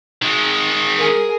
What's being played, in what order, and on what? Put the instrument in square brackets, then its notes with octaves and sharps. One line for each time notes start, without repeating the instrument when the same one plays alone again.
[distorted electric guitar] D#3 G#3
[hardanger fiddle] G#4 A#4